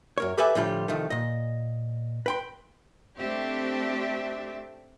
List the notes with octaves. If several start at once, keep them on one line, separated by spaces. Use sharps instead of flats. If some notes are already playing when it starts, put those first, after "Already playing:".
F#2 A#4 C#5
G4 A4 B4 D5 E5 G#5
A2 D3 F3 G3 F4 G4
C2 D#3 F3 A3
A#2 D#5
B4 G5 C6
A3 C4 D4 G4 E5